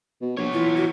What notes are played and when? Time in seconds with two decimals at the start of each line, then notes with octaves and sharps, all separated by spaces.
0.22 B2
0.37 A#1 B3 C#5
0.53 E3 F4
0.75 F#4